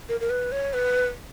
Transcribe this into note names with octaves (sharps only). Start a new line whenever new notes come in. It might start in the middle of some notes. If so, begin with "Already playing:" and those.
A#4
A#4
B4
C#5
B4